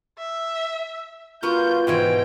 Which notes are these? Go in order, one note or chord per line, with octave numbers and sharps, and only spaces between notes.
E5
B3 F4 F#4 A#4 G6
G#2 B2 E3 G5